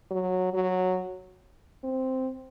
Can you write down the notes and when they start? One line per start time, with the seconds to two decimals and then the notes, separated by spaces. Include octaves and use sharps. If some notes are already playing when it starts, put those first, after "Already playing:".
0.11 F#3
0.54 F#3
1.84 C4